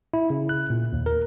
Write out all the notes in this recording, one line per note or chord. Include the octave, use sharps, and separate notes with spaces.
E4
C#3
F#6
A#2
D#2
A#4